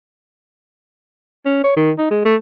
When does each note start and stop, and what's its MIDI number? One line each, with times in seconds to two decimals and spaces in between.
1.45 1.63 61
1.63 1.72 73
1.76 1.91 51
1.98 2.09 63
2.11 2.22 56
2.25 2.36 57